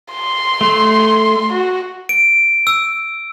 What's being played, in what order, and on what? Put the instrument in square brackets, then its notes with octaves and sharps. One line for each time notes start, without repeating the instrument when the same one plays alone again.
[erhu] C6
[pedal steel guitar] A3
[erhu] F#4
[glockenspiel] D7
E6